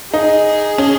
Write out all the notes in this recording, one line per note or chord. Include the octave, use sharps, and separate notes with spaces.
D#4 G#4
C#4